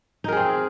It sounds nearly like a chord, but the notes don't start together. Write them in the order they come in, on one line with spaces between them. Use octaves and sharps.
D#4 A#4 G#4 C4